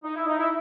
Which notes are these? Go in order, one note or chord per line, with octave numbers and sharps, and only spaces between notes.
D#4
E4
D#4
E4